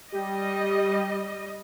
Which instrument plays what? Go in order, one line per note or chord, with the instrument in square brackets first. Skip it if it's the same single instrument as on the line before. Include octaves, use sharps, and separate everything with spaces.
[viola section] G3 D#5 [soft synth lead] G4